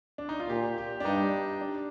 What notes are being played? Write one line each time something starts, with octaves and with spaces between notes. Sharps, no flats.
D4
D#4
F4
A#2 G4
G4
D4
G2 D#4
D4